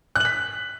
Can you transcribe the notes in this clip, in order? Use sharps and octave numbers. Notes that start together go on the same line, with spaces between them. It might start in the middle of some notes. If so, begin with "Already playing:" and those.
F#6 B6 F#7